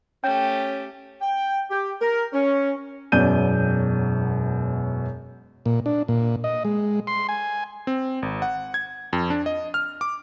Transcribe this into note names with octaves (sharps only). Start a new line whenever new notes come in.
A3 C#4 G4 G5
G5
G4
A#4
C#4
E1 F#2 B2 D5 G6 D#7
A#2
D4
A#2
D#5
G#3
C6
G#5
C4
G#1
F#5
G#6
F2
D4
D#5
F6
D6